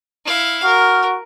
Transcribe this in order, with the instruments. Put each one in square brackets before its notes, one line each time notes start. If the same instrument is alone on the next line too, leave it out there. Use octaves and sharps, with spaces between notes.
[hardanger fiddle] E4 F5
[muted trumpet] F#4 [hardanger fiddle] A#4 [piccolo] F6